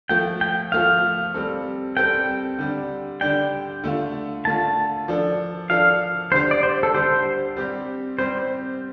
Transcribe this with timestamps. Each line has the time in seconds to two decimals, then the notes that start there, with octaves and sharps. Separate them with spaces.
0.09 F3 A3 F4 G5
0.41 G5
0.72 F3 A3 F4 F5
1.34 G3 C4 A4
1.97 G3 C4 A4 G5
2.59 D3 G3 D4
3.21 D3 G3 D4 G5
3.84 D3 A3 F4
4.45 D3 A3 F4 A5
5.08 F3 D4 A4
5.70 F3 D4 A4 F5
6.32 D3 G3 D4 G4 C5
6.51 D5
6.63 C5
6.83 A4
6.94 D3 G3 D4 G4 C5
7.56 G3 C4 G4
8.18 G3 C4 G4 C5